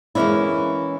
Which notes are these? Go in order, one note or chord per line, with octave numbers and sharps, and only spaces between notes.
E3 G#3 A#3 C#4 D4 E4